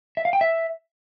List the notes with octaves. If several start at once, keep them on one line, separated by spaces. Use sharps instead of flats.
E5
F5
G5
E5